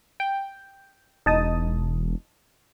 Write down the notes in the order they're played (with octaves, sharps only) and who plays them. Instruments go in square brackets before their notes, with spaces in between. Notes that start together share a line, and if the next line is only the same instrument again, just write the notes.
[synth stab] G5
[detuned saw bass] E1 [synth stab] D#4 A5 D#6